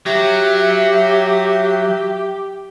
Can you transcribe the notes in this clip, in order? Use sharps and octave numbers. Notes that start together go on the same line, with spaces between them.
F#3 G4 E5